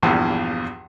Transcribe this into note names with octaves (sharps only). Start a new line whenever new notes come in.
A#1 E2 G2 E3 F3 F5